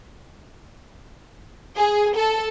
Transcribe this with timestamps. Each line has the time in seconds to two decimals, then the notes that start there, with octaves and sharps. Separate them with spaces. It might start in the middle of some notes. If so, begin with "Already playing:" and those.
1.77 G#4
2.14 A4